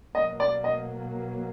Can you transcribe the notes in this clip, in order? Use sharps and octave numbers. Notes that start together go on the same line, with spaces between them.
B2 F#3 A#3 D#5
D5
D#5